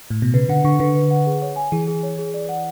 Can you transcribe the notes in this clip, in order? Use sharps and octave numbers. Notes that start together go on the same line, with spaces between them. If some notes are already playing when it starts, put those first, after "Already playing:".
A2
B2
C#3 B4
D3 F#5
D3 C#6
D3 B4
B4
F#5
G#4
C#5
G#5
E3 G#4
G#4
C#5
G#4
D5
F#5